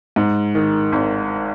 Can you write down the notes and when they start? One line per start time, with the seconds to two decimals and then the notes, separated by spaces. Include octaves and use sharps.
0.16 G#2
0.55 D#3
0.92 G#1